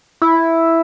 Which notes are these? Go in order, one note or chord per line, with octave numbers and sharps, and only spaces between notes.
E4